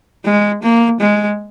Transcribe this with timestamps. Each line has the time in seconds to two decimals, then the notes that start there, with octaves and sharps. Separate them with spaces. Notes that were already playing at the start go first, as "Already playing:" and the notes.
0.25 G#3
0.62 A#3
1.00 G#3